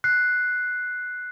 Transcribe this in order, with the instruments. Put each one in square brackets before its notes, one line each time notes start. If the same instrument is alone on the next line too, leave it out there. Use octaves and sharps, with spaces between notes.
[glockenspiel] F#6 C7